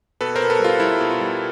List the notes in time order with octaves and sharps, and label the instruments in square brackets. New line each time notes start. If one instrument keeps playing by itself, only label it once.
[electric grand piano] B2 A4 B4
B2 A#4 C5
A4 B4
G3 F4
G3 E4
B2
F4
G3